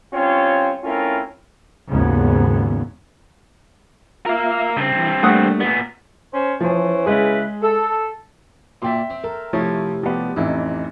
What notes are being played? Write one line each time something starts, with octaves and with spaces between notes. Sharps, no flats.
G2 C4 C#4 F4 C#5
A3 C4 C#4 E4 F4 A#4
G#1 D#2 G#2 C#3 B3
F4 A#4 E5 F5
G2 C#3 C4
E3
G3 A3 A#3 D4 F#5 D#6
A#2 B3
C#4 C5
E3 F3 C#4 C5
C#3 G#3 E4 G#4 B4
A4
A#2 D5 E5 G5 C6
C4
A4 A#4
C3 F3 A3 E4 C#5 D#6
F3 B3 G4 D5
A1 F2 E3 D#4 E4